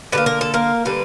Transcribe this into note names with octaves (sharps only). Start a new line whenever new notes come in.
D3 G3 B4
A#3
A#4
A4
A#3 A#4
D3 G3 A#3 B4